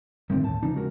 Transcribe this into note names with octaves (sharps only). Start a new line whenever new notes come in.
G1 A2 D3 D#3 A3 C4
D#2 A2 A3 A5
C#3 E3 F3 D4 D#4
G#3 F#4 A#4